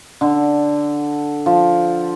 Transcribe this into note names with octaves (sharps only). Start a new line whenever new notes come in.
D3
F3